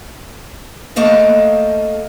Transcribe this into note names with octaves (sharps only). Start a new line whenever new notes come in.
A3 A#3 A4 D#5 F5